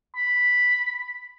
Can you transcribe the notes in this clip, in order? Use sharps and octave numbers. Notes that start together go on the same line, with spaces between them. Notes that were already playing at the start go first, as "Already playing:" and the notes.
B5